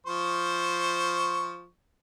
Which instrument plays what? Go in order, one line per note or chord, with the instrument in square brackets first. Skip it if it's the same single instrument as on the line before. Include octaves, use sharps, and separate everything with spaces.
[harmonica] F3 C5 C#6